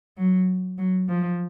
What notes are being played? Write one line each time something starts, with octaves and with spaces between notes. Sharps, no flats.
F#3
F#3
F3